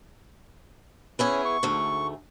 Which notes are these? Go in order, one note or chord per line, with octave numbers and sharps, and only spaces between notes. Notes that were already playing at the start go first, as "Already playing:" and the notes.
B3 C#4 E4 G#4
C#6
D2 G#2 A3